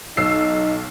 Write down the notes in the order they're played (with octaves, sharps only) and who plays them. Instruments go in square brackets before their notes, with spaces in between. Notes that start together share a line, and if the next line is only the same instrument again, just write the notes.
[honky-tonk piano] B1 E6 C7 [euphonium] D#4